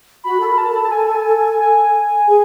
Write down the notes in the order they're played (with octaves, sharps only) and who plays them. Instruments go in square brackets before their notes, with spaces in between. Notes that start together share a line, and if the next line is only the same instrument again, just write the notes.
[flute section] F#4 [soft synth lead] B5
[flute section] A4
A#4
[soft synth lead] A5
[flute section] A4
[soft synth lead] A5
G#5
G#5
[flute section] G#4